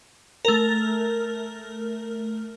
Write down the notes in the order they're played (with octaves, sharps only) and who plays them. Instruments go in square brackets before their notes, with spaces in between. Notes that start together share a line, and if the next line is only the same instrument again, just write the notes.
[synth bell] A3 A#4